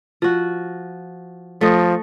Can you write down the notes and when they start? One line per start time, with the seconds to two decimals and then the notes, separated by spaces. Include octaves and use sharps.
0.22 F3 F#4
1.61 F3 A3 D#5